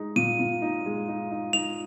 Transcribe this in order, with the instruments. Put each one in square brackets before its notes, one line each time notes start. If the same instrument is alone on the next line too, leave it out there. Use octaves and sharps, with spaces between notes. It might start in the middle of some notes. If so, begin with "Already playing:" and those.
Already playing: [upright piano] G#3 D#4
[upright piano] A#2 [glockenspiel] D#7
[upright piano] A#2
D#4
G#3
D#4
D#4
[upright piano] D#4 [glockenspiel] F7